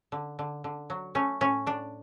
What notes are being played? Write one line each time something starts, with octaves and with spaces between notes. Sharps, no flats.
D3
D3
D3
F#3
A3 C#4
A2 C#4
A2 D4